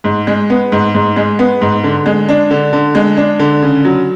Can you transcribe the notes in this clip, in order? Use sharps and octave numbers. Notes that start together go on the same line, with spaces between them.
G#2
G#3
B3
G#2
G#2
G#3
B3
G#2
D3
G#3
D4
D3
D3
G#3
D4
D3
C#3
F#3